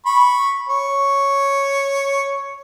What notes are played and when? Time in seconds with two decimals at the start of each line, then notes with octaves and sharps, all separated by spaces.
0.06 B5 C#6
0.68 C#5